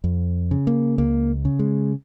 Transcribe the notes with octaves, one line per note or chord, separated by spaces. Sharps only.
F2
C#3
A#3
C#2 A#3
C#3
G#3